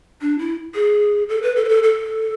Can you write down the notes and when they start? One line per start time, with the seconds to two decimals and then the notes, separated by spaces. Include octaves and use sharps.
0.21 D4
0.39 E4
0.75 G#4
1.29 A4
1.42 B4
1.56 A4
1.65 B4
1.69 A4
1.83 A4